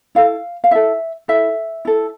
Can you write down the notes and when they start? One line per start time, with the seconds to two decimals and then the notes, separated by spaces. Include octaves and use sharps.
0.15 E4 A4 F5
0.64 F5
0.71 E4 A4 E5
1.28 E4 A4 E5
1.85 E4 A4